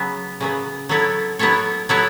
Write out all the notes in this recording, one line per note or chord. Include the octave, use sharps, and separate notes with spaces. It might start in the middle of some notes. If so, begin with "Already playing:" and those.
Already playing: C#3 F#3 B3
C#3 F#3 B3
F#3 B3 E4 A4 C#5
F#3 B3 E4 A4 C#5
F#3 B3 E4 A4 C#5